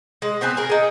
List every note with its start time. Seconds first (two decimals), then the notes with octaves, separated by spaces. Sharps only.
0.22 G#3
0.41 B3 C4 B4 G#5
0.57 G#4 A#4
0.70 D#4 G#4